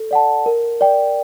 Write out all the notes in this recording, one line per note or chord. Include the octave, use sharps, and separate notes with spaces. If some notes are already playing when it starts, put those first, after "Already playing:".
Already playing: A4
D5 F#5 A5
A#4
D5 G5